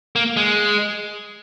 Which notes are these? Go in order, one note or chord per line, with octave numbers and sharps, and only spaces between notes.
A#3
G#3